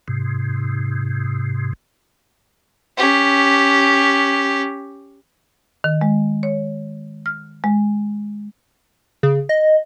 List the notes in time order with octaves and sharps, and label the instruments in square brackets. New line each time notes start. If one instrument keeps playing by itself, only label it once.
[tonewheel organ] G#2 C3
[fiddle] C#4 G4
[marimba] D#3
G#3
C#5
F6
G#3
[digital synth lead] C#3
D#5